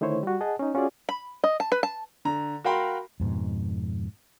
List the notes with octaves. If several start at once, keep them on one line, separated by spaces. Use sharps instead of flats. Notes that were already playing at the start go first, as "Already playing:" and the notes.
D3 D#3 A3 E4 C5 C#5
G3 F#4
G#4 D#5 F#5 A5
C#4 D#4
C#4 F4 F#4 G#4 D5
B5
D#5
A5
B4
A5
D3 A#5
F#4 A#4 F5 G5 B5 C6
F2 G#2 B2